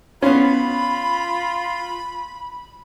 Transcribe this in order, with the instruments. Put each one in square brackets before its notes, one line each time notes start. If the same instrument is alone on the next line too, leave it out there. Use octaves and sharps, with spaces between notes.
[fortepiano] B3 C#4 [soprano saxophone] F4 [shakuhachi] B5